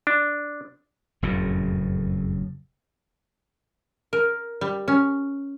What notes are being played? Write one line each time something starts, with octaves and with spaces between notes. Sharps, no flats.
D4
F#1 F2 A2 C#3
A#4
G3
C#4